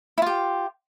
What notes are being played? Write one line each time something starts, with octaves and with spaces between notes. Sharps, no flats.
E4 F4 G4